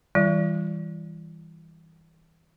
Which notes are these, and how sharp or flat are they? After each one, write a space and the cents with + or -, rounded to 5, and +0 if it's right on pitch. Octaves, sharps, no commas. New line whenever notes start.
E3 -25 G3 +0 F4 -40